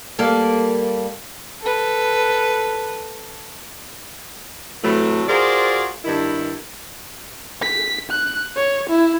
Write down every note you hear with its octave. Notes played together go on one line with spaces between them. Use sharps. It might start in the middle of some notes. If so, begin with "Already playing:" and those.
G3 A#3 A4
A4 B4
A2 C3 E3 F#3 A3
F4 F#4 G#4 A#4 C5 D5
G2 D#3 E4
B6
F#6
C#5
E4